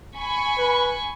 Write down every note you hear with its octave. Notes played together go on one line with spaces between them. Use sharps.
G#5 B5 C#6
B4